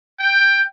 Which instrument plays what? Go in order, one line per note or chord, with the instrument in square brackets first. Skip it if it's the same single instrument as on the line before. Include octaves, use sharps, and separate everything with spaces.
[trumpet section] G5